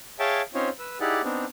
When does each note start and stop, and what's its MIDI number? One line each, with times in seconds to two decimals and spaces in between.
0.19 0.42 68
0.19 0.42 73
0.19 0.42 76
0.19 0.42 77
0.19 0.42 79
0.19 0.42 81
0.54 0.69 60
0.54 0.69 61
0.54 0.69 63
0.54 0.69 65
0.54 0.69 72
0.54 0.69 73
0.79 0.98 71
0.79 0.98 88
1.00 1.22 63
1.00 1.22 64
1.00 1.22 67
1.00 1.22 68
1.00 1.22 74
1.00 1.22 78
1.24 1.45 59
1.24 1.45 60
1.24 1.45 62
1.24 1.45 63